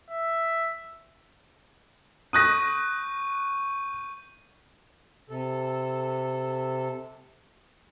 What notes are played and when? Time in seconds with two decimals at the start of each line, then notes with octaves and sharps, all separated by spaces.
0.11 E5
2.33 C#6 D#6 F#6 G6 A#6 D#7
5.29 C3 A4